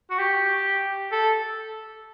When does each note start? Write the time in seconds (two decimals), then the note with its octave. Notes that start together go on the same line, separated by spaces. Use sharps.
0.10 F#4
0.19 G4
1.12 A4